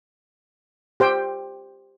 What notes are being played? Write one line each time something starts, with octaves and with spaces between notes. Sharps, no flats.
G4 C5 G5